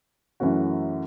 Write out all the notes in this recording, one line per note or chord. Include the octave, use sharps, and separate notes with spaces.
F#2 E3 A3 C#4 F#4